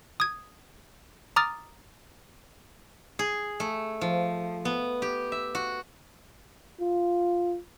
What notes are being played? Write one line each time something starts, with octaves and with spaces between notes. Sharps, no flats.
D#6 G#6
A#5 D6 D#6 F6 A6
G#4
A3
F3
B3
G4
E5
F#4
F4